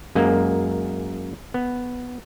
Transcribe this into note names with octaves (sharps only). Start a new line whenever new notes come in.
F#2 G#3 A#3
B3